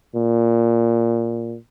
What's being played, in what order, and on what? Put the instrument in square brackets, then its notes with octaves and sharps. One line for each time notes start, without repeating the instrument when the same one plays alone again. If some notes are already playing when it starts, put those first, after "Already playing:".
[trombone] A#2